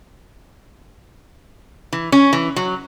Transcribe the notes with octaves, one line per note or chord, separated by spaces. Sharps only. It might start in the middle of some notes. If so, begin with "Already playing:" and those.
E3
C#4
E3
F#3